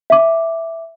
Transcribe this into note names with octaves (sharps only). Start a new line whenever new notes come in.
E5 D6